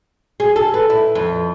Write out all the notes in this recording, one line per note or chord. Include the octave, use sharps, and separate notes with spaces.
G#4
A4
B4
E4
F2